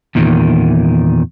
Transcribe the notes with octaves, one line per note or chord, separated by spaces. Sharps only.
E2 A#2 D#3